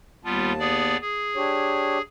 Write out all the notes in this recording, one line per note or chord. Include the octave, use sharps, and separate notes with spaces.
D#2 G3 B3 F4 A5
B3 G#4 D5
G#4
D4 G4 C#5